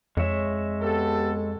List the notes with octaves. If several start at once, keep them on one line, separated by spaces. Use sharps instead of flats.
F2 G#3 C#5 E5
B3 G4 A4